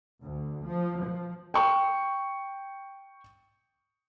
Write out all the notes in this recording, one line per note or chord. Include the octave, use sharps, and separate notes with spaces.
D2
F3
F3
G5 C#6